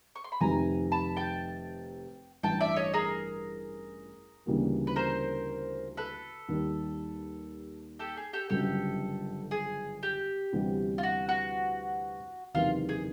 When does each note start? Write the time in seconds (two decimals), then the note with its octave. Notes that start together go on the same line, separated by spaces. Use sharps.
0.15 C#6
0.24 C6
0.32 B5
0.41 F1 F2 C3 D#3 G#5 A#5
0.92 A5 B5
1.16 G5 A5
2.43 A1 G2 E3 G5 A5
2.61 D5 E5
2.76 C#5 D#5
2.94 G#4 A#4
4.46 D2 C#3 E3 G3 A#3
4.87 B4
4.96 A#4 C5
5.97 A4 B4
6.48 D#2 D#3 G3
7.99 G4 A4
8.17 G#4
8.33 G4 A4
8.50 G1 F#2 C#3 F#3 G4 A4
9.51 G#4
10.03 G4
10.53 D2 C3 E3 G3 B3
10.98 F4
11.03 F#4
11.29 F#4
12.54 F#1 E2 C3 D#3 F4
12.89 G#4